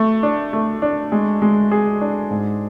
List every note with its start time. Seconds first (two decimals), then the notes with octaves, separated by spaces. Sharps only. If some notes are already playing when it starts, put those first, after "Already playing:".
Already playing: A3
0.23 D4
0.53 A3
0.82 D4
1.12 G#3
1.42 G#3
1.71 G#4
2.01 D4
2.31 G#2